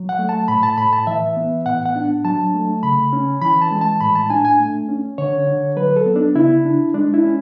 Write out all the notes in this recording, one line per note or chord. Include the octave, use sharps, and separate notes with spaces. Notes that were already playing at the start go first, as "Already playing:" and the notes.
Already playing: F#3
F#5
A3
A5
A2 B5
A5
A2 B5
A5
E3 E5
B3
A2 F#5
F#5
D4
F#3 A5
A3
C#3 B5
C#4
E3 B5
A5
G#3
A5
A2 B5
A5
D4 G#5
G#5
A3
C#4
D3 C#5
D3
F#3 B4
A4
B3
D4
C#3 E4
D4
G#3 D4
E4
C#4